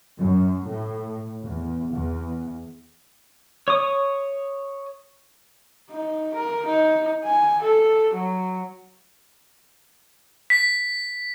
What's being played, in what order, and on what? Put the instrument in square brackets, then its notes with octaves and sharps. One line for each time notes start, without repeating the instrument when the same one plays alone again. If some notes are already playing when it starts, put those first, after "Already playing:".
[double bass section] F#2
A2
E2
E2
[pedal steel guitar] C#5 D#6
[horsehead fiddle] D#4
A#4
D#4
G#5
A4
F#3
[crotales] B6